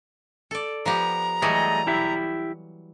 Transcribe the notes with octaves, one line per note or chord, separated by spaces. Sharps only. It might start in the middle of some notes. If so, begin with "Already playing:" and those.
A4 D5
F3 B3 G4 A#5
E3 F#3 G3 A3 G#4 D#5
E4 G4 E5